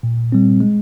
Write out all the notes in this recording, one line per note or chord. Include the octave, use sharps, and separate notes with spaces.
A#2
G3 C4
G#3